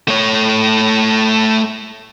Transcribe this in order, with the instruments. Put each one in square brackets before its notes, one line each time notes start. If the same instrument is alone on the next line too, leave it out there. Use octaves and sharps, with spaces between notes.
[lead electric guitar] A3 C#5